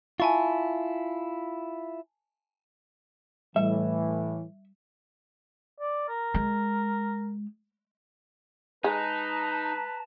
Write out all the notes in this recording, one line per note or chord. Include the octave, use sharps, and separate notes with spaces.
E4 F4 G#5 A5 C#6
A2 E3 G3 E5
D5
A#4
G#3
G#3 D#4 B4 A5 A#5